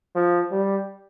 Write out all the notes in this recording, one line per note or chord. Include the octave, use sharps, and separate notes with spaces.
F3
G3